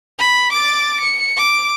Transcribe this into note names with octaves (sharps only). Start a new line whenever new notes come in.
B5
D6 A6
C#7
D6